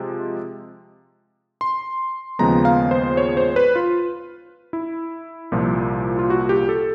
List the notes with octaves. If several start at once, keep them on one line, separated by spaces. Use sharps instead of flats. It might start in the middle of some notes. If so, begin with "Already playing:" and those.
Already playing: C3 F3 G#3
C6
D#2 C#3 F3 G#3 B3 A#5
F5
C5
C#5
C5
B4
F4
E4
C2 A#2 F3
F4
F#4
G4
A4